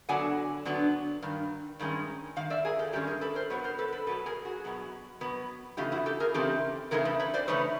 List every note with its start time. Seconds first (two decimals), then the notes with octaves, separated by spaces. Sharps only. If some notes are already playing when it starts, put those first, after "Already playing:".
0.09 D3 F#3 B3 D4 F#5 G#5
0.65 D3 F#3 B3 D4
1.22 G2 D#3
1.80 G2 D#3 G#3 C#4
2.36 G2 D#3 F5
2.50 D5 E5
2.65 G#4 A#4
2.79 G4 A4
2.93 G2 D#3 G#3 C#4 G4 A4
3.07 G#4 A#4
3.21 A4 B4
3.35 A#4 C5
3.50 B2 F#3 B3 B4 C#5
3.64 A#4 C5
3.79 A4 B4
3.92 A4 B4
4.07 B2 F#3 B3 A4 B4
4.26 G#4 A#4
4.45 F#4 G#4
4.64 B2 F#3 B3
5.21 B2 F#3 B3
5.77 C#3 E3 A3 D#4 F4 G4
5.92 E4 F#4
6.06 G4 A4
6.20 G#4 A#4
6.34 C#3 E3 A3 C4 D#4 G4 A4
6.91 C#3 E3 A3 C4 D#4 G#4 A#4
7.05 A4 B4
7.20 B4 C#5
7.34 C5 D5
7.48 C#3 E3 A3 D#4 B4 C#5